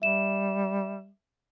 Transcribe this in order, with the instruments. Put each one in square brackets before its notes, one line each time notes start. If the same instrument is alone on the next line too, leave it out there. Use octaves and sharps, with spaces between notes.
[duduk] G3 [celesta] E5 E7